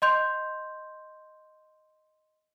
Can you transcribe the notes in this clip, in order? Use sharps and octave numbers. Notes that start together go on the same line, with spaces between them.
D#5 C6 G6 F7